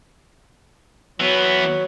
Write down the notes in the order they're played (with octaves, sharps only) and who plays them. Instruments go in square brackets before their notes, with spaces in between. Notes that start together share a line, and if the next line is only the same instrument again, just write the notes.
[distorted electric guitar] E3 B3 [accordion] F#3